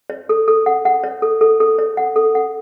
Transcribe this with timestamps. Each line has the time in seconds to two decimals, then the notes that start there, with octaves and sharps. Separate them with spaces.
0.10 C#5
0.29 A4
0.48 A4
0.66 F#5
0.85 F#5
1.04 C#5
1.22 A4
1.41 A4
1.60 A4
1.79 C#5
1.97 F#5
2.16 A4
2.35 F#5